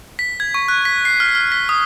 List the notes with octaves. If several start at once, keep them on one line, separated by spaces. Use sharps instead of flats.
B6
G#6
C#6
F#6
B6
C7
F6
F6
B6
D#6